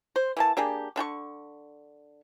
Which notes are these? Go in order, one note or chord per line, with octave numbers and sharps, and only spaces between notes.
C5
E3 A#3 A5
A#3 D4 G4 G#4
D3 D4 G5 C#6